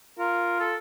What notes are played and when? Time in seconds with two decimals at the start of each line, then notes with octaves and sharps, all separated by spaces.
0.19 F4 A#4
0.60 A4